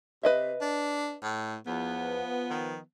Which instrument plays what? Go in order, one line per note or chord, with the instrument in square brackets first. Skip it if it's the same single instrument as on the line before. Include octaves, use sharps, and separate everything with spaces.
[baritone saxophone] C3 [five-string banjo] B4 D#5 E5
[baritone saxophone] D4
A2
[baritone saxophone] E2 [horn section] F3 B3
[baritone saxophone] D#3